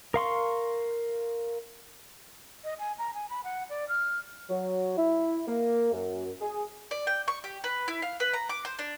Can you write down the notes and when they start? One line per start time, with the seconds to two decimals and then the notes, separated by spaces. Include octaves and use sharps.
0.14 A#4 F5 C6 C#6
2.64 D#5
2.79 G#5
2.98 A#5
3.14 G#5
3.30 B5
3.44 F#5
3.70 D5
3.89 F6
4.50 F#3
4.97 E4
5.48 A#3
5.92 F#2
6.41 G#4
6.91 D5
7.07 G5
7.28 C#6
7.44 G4
7.64 B4
7.88 E4
8.02 F5
8.20 B4
8.34 A#5
8.49 D6
8.65 C5
8.79 D4